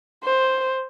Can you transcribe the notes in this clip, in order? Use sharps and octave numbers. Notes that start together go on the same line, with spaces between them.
C5